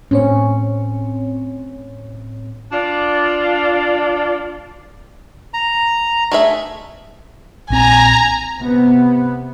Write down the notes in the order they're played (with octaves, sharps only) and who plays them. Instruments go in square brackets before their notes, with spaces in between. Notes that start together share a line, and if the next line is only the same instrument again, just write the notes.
[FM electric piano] A2 C4 C#5 [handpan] C#4
[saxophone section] D4 F4 D5
[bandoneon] A#5
[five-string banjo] A3 G#4 E5
[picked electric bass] A#1 C4 [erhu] G#5 [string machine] A#5
[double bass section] C3 B3